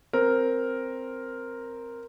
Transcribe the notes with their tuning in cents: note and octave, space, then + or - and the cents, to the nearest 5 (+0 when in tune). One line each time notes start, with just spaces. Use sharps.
C4 +0 A#4 +0